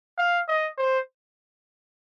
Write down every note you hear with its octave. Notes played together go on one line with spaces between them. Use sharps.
F5
D#5
C5